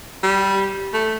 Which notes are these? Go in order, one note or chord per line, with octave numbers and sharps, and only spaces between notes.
G3
A3